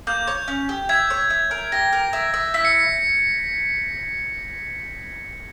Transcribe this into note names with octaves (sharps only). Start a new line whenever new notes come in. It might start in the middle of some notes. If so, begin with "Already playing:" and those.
A#3 G6
C#5
C#4
G4
E5 G#6
C#5
E5
A#4
G4 A#6
A#4
E5
E5
E4 B6
C#7